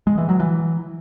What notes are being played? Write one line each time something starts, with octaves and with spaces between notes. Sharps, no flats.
G#3
E3
F#3
E3